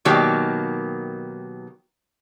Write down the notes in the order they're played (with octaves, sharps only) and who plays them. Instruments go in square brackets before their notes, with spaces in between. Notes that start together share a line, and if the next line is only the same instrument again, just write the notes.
[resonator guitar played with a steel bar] B2 D#3 F#3 A#3 G4